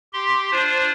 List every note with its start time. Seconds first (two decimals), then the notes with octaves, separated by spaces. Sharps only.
0.13 G4 C6
0.52 D4 F4 C5